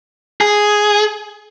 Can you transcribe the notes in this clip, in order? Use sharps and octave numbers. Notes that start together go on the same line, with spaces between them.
G#4